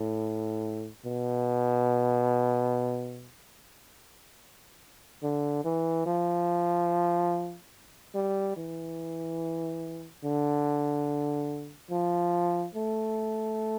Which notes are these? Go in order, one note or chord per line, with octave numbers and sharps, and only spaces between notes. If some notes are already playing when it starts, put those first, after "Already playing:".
Already playing: A2
B2
D3
E3
F3
G3
E3
D3
F3
A3